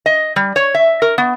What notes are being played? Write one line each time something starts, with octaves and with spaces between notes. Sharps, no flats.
D#5
G3
C#5
E5
A#4
B3